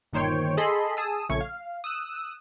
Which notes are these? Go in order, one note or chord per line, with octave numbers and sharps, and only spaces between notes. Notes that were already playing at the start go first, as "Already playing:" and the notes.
G1 A#2 D#3 C5 C#5 G5
G#4 A4 D#5 A5 B5 C6
G#4 A5 D#6 E6
A#1 C#3 A3 C#4 C#6 G#6
F5
D#6 E6 F#6